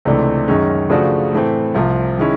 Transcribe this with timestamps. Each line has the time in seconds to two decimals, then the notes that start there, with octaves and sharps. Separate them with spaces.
0.05 C#2 C3 E3 A3 D4
0.48 F#2 D#3 G#3 C#4
0.90 C#3 F3 A3 D4 F#4
1.33 A2 E3 A3 C4
1.75 C2 C3 F3
2.18 D#3 G#3 C#4 E4